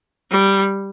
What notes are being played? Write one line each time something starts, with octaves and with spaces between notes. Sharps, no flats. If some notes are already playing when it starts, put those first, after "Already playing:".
G3